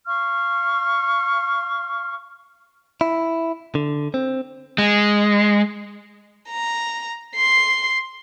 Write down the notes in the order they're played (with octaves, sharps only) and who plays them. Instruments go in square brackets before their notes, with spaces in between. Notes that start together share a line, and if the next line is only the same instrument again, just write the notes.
[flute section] F5 C#6 F6
[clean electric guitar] E4
D3
C4
[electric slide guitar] G#3
[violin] A#5
C6 C7